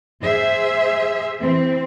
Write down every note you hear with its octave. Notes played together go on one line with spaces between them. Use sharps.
G#4 C5 E5
E3 C4